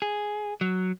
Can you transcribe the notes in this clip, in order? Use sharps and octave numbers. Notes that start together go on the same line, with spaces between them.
G#4
F#3